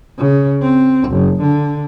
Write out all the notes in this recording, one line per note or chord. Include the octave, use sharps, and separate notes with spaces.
C#3
C4
F#1
D3